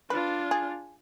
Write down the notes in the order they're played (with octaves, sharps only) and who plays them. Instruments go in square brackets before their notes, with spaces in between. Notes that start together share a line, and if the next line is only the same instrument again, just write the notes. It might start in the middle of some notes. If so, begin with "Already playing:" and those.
[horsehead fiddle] D4 F4 [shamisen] B4
[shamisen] G#4